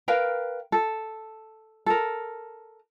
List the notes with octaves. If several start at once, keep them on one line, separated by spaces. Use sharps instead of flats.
A#4 B4 F5 G5
A4
A4 A#4